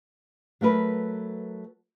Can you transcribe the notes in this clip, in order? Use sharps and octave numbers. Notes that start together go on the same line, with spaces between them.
F#3 A3 A#4 B4